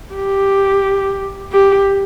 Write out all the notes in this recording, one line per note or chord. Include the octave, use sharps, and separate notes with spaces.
G4
G4